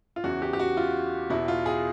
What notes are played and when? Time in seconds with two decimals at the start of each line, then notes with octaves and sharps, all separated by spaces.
0.16 F4
0.24 E2 C#3 E3 F#4
0.42 G4
0.53 G4
0.59 F#4
0.77 F4
1.30 E2 B2 E4
1.48 F4
1.66 G#4